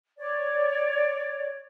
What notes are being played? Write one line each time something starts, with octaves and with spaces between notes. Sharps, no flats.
C#5 D5